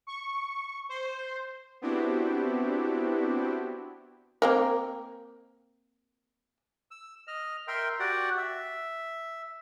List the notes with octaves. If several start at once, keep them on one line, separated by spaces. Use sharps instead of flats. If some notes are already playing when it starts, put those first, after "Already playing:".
C#6
C5
B3 C4 D4 E4 F#4 G4
A#3 C4 A#4
E6
D#5 F6
A#4 E5 G5 C6
F#4 G4 D5 F#5
E5